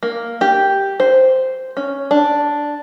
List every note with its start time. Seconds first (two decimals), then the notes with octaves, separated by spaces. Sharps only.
0.03 A#3
0.41 G4
1.00 C5
1.77 C#4
2.11 D4